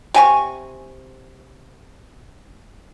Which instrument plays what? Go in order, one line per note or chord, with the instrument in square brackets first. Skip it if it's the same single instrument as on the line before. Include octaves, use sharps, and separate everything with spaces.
[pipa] C3 G#5 C#6